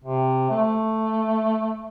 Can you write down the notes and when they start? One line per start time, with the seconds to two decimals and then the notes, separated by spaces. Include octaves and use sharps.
0.04 C3
0.51 A3